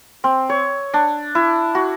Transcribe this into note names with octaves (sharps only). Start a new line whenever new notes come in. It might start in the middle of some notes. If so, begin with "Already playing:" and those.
C4
C#5
D4
E4
F#4